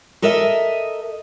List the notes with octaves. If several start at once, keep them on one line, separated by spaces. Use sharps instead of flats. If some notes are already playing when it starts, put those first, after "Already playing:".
A4 A#4 D#5 E5